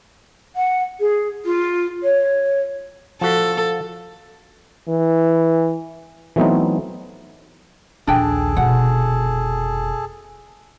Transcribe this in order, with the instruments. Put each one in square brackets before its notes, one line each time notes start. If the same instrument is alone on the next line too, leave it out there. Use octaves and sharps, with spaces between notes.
[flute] F#5
G#4
F4
C#5
[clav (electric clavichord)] F3 F#4 [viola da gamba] A4
[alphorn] E3
[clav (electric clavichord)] E3 F#3 A3 B3 C4 D#4
[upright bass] A#1 D#2 [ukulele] D4 G5 [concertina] G#4 A4
[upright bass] F1 B2 [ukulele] F#5